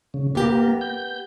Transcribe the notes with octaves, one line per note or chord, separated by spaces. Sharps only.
C#3
A#3 B3 G4
G6